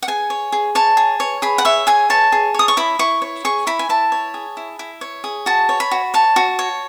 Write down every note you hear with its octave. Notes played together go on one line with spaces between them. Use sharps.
F#5
G#4 G#5
C#5
G#4
C#5 A5
G#4
C#5
G#4 B5
F#5
C#5 E5
G#4 G#5
C#5 A5
G#4
C#5 D#6
C#6
E4 B5
E4 C#6
C#5
G#4 C#6
E4 B5
G#5
E4 A5
C#5
G#4
E4
E4
C#5
G#4
F#4 A5
C#5
B5
F#4
C#5 A5
F#4
C#5